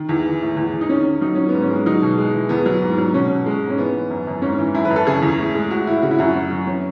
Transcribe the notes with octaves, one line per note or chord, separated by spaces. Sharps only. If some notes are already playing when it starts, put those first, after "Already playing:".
Already playing: D#3
E2
E3
A2
E2
E2
D#4
D#3 C#4
D#3
F#3 D#4
F#3 C#4
G#2 B3
C#4
G#3
F#3 D#4
B2
G#3
E3
E2 B3
F#3
G#2
F#3
B2 C#4
B2
G#3
G#2
C#4
E3 B3
E3
F#2
F#2
G#2 C#4
E3
F#2 E4
B4
F#2
A4
C#3 G#4
E2
A2
G#3
A2 F#4
A2 E4
C#3 F#4
E4
F#2 F#4
F#3
F#3
E3 C#4